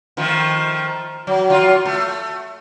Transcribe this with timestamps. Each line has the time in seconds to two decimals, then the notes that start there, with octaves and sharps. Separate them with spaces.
0.17 D#3 F3 A3
1.27 F#3
1.50 F#3 F4
1.86 A3